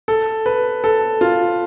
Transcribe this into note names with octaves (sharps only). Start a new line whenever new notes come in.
A4
B4
A4
F4